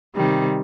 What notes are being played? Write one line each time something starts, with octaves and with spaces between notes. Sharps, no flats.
C3 D#3 G3